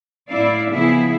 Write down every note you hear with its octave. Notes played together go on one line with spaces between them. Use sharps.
A2 E4 D5 F5
C#3 F3 B3 E4 G#4